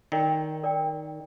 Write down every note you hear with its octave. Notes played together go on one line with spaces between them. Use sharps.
D#3 A#4 D5 G5
A#4 D5 G5